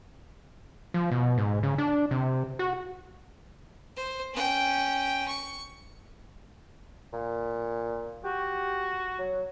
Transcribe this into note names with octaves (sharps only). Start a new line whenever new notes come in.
F3
B2
G#2
C#3
D4
C3
F#4
C5
C#4 G5
C#6
A#2
F#4 G4
F#3